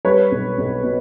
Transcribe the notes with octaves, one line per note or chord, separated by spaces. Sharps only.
G3 B4 C#5
B1
B1
B2